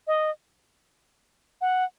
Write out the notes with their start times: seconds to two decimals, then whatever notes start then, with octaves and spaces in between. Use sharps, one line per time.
0.07 D#5
1.61 F#5